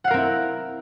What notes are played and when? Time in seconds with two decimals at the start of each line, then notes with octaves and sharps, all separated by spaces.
0.04 F#5
0.07 F5
0.11 A#4
0.14 C4
0.17 E4